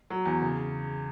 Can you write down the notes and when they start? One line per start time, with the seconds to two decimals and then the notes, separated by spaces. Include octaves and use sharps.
0.10 F#3
0.25 E2
0.42 C#3